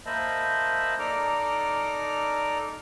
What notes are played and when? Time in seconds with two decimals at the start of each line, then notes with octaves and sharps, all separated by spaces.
0.06 A#3 C5 D#5 E5 A5 B5
0.99 D#4 A4 D5 A#5 D6 F6